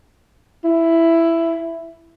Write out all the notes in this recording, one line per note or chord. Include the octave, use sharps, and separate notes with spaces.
E4